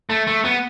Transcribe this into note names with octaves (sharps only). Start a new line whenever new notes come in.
A3
A3
B3